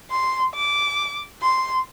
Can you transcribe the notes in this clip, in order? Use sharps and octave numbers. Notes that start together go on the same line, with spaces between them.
C6
D6
C6